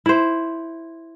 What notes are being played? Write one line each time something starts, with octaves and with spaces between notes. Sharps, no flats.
E4 C5